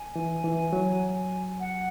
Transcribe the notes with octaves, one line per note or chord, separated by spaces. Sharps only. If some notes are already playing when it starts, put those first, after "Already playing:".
Already playing: G#5
E3
E3
F#3
F#5